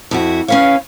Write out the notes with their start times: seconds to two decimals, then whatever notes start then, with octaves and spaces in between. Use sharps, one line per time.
0.11 F2 E4 F#4
0.48 C#4 B4 C#5 F5